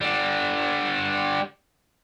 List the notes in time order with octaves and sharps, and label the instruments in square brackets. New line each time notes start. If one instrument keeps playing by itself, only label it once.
[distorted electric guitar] D3 G3